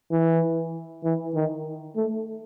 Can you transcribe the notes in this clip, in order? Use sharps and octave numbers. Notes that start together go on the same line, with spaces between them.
E3
E3
D#3
A3